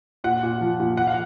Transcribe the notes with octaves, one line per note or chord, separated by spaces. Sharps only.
A#2 F#5
A#2
F3
A#2
F3 F#5
F5